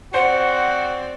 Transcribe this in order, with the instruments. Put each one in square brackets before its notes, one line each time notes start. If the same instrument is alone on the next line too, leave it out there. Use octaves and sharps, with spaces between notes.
[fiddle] C4 D5 [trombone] F#4 [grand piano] C5 [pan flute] F#5